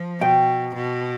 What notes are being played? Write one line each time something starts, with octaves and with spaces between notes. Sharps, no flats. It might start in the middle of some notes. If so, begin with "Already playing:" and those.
Already playing: F3
B2 G5
B2